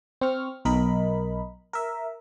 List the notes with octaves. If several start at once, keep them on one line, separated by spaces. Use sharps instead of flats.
C4 C#6 F6
B1 A#4 D#5 B5
A#4 E5